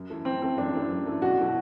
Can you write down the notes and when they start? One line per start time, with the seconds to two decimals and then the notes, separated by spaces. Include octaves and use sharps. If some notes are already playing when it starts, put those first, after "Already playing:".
Already playing: F#2
0.10 E3 A3
0.25 F#2 C4
0.42 E3 A3 C4
0.57 F#2 D4
0.73 E3 A3
0.89 F#2
1.06 E3 A3
1.22 B1 F#4
1.38 B2 F#3 A3 E4